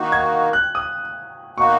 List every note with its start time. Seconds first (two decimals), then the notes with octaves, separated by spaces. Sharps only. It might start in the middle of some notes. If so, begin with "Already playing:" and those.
Already playing: D#3 A#3 D#4 F#4
0.12 G#6
0.53 F#6
0.75 D#6
1.57 B2 A#3 D#4 F#4 C#6